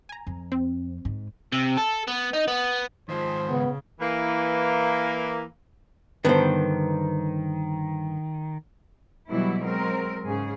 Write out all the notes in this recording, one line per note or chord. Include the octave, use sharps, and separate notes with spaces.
G#5 A#5
F2
C4
G#2
C3
A4
B3
D#4
B3
G#2 D#3 F3 C5
C#3 B3
E3 A#3
G2 D3 D#3 B3 B4 C5
B2 E3 F#3 G3 E4
F#3 G#3 C4 A#4
G#2 C#3 G#4